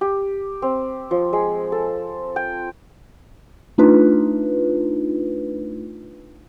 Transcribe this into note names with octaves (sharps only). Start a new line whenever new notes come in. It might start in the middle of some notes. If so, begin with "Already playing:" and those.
G4
C4
F3
G#3
A4
G5
A3 D4 D#4 F4 B4